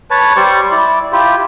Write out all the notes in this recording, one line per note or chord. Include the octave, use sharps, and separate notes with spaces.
B4 C#5 A5
G3 C5 D5 C#6
E4 D5
E4 F4 G4